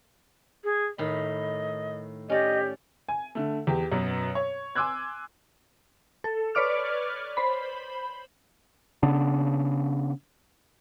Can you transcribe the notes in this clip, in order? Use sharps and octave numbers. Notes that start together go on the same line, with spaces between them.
G#4
A2 D#3 D#5 B5
C#4 G4 D5 D#5
G#5
D3 A3
E2 G4
F#2 B2 B3
C#5
G#5 C6 D6 E6 F#6 G#6
A4
B4 C#5 D5 D6 F6
C5 B5
C#3 B3 D4